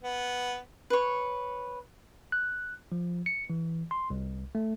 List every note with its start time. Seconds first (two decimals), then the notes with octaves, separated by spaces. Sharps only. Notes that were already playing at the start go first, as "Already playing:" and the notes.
0.03 B3
0.90 B4 C#5
2.32 F#6
2.92 F3
3.26 C#7
3.50 E3
3.91 C6
4.10 C2
4.55 A3